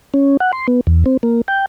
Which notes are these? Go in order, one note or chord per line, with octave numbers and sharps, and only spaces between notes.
C#4
F#5
C6
B3
E2
C4
A#3
G5